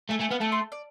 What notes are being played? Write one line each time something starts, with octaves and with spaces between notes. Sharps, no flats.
A3 G#5
A3 G#5
B3 F5
A3 A5
C6
D5